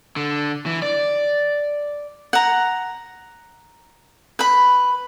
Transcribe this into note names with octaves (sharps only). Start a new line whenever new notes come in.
D3
E3
D5
F#5 A#5
B4 B5